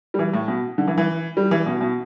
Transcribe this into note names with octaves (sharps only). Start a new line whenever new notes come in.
G3
E3
A2
B2
D3
E3
E3
G3
E3
B2
B2